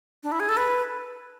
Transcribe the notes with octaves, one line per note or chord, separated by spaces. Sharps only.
D4
E4
G#4
A4
B4